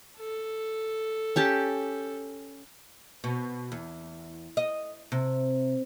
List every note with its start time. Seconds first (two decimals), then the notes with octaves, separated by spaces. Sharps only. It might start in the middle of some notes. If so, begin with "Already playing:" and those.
0.19 A4
1.36 C#4 G4 A5
3.24 B2
3.72 E2
4.57 D#5
5.12 C3